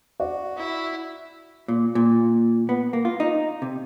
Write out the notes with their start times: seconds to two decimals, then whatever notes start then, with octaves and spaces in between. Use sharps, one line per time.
0.20 F#4 D5
0.57 E4
1.68 A#2
1.95 A#2
2.69 B3
2.93 A#3
3.05 F4
3.20 D#4
3.62 C3